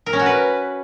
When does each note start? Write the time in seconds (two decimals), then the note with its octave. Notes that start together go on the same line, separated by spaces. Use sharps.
0.06 A#4
0.13 C#4
0.19 F#4
0.26 B4